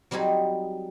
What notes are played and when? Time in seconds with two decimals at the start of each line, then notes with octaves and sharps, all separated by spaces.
0.11 F#3 G3 C4 D#4 G#4